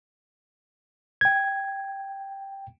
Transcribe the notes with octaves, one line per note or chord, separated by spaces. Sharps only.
G5 G#6